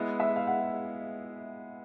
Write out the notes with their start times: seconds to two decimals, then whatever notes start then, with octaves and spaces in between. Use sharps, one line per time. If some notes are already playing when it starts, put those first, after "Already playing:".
Already playing: G#3 B3 E4
0.20 E5
0.36 F5
0.47 F#5